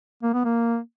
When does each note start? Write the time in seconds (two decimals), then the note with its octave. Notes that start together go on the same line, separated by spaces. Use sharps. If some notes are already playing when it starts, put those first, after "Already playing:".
0.23 A#3
0.33 B3
0.45 A#3